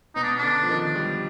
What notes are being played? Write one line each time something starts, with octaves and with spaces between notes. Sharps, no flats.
B2 D#4
D4
D3 D4
F3
D#3
G3